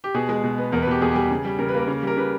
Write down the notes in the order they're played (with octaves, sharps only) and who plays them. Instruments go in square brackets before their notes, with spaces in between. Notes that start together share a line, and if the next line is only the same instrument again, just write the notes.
[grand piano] G4
B2 G#4
G#3
B2
B3
E2 A#4
B4
B2 G4
E2 G#4
G4
G3 G#4
C#3
G3
C#3 A#4
B4
A#3 A#4
C#3
G3 A#4
C#3 B4